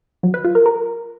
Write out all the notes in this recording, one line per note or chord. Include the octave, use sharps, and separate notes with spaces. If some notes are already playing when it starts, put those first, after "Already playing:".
F#3
B4
F4
A#4
A#4